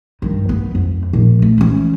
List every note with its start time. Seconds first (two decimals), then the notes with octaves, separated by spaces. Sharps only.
0.22 G2 D#3
0.49 B3
0.75 F2
1.13 D#1 A#1
1.42 A3
1.58 E3 C#4